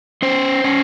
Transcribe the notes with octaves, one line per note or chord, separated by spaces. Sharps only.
C#4 C5
C#4